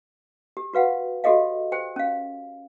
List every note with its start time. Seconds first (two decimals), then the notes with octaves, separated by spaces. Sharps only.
0.57 G4
0.74 F#4 B4 F5 F#5
1.24 F#4 G4 A4 D#5 F5
1.72 G4 C5 G5
1.96 C#4 F5